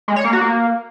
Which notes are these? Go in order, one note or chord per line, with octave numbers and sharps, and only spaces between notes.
G#3
C#5
A#3
F#4
A#3